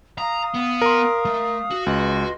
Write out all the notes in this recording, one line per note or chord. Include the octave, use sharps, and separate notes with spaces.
F5 A#5 D#6
B3
A#4 C6
A3
F#4
C#2 B4 D#5 C6